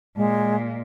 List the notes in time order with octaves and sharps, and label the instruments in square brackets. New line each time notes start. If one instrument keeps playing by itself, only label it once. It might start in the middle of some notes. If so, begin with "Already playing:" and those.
[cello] A#2 [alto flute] G#3